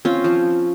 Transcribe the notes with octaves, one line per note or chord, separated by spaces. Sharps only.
C4 C#4 F4
F3